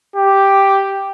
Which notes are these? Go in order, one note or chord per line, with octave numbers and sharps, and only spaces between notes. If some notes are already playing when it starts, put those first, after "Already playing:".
G4